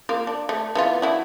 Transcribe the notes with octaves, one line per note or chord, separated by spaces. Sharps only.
A#3 F4
D4
A3
E3 B3 F4
F#3 E4 F#4